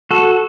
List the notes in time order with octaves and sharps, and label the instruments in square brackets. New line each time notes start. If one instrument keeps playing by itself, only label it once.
[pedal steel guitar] F#4 A4